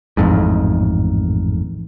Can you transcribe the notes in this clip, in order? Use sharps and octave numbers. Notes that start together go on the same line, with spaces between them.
A1 F2 G#2